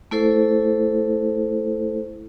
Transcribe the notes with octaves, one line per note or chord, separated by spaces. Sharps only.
A3 E4 A4 C5